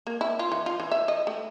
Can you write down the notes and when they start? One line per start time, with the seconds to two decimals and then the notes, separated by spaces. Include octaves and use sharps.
0.07 A#3
0.21 E4
0.39 F4
0.52 E3
0.66 F4
0.80 E3
0.92 E5
1.08 D#5
1.27 A3